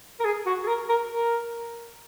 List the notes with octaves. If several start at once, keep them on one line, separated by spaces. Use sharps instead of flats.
A#4
G#4
F#4
G#4
A#4
A#4
A#4